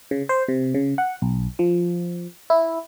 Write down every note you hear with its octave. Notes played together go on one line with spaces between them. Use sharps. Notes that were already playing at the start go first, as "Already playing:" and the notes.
C#3
C5
C3
C#3
F#5
B1
F3
E4